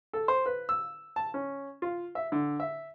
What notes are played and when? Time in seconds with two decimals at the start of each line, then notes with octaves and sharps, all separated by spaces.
0.13 A4
0.28 C5
0.46 B4
0.69 E6
1.16 A5
1.34 C#4
1.82 F4
2.15 E5
2.32 D3
2.60 E5